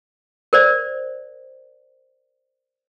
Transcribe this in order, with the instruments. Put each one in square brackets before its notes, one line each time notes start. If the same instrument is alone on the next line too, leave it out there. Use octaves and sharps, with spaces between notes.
[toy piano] A#4 C5 D5